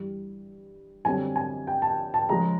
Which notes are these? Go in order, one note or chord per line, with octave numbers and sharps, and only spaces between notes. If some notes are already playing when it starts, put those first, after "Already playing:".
Already playing: G2 E3 G3
F#2 D3 G3 C4 G#5
G#5
G5
A5
A5
C#3 F3 G#3 A#5